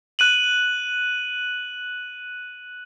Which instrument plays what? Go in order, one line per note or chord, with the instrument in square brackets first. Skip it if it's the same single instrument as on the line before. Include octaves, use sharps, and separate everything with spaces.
[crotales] F#6 D#7 F#7